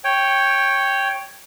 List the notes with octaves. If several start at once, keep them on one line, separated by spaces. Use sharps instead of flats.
C#5 G5